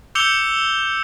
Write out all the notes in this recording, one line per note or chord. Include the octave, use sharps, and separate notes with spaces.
D6 E6 G6 C#7 F7 G7